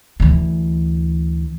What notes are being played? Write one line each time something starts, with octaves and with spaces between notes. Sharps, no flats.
D2 E3